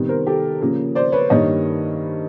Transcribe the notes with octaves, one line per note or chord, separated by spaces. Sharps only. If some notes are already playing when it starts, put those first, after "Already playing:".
Already playing: C3 D#3 G3 B3
A#4 C5
G4 A4
C#3 F3 A#3
C5 D5
B4 C#5
G2 D#3 G3 A#3 C#5 D#5